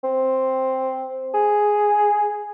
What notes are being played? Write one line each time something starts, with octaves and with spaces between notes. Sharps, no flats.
C4
G#4